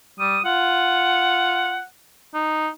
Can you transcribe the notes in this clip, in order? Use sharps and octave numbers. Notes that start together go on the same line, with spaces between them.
G3 D#6
F4 F#5
D#4